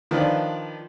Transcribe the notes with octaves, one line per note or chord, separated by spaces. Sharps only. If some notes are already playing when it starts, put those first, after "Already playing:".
D#3 F3 D4 F4 B4 D5